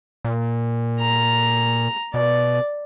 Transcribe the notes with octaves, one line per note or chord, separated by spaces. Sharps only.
A#2
A#5
B2 D5